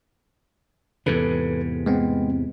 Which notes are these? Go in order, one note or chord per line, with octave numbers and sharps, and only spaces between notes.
E2 G#2 C3 A4 B4
G#3 B3 C4